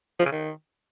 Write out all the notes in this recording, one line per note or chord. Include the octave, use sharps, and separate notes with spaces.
F3
C#3
D#3